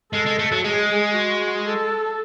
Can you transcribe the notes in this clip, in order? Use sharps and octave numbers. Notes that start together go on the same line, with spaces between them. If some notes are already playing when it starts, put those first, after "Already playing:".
G#3 A4
G#3
A3
F#3
G#3 G#4
F#4
A4